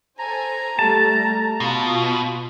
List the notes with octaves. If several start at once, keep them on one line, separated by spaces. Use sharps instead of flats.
A4 C5 G#5 A#5
G3 A3 A5
B2 F4